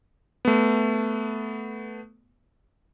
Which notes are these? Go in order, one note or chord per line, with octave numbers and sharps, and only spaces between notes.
A3 B3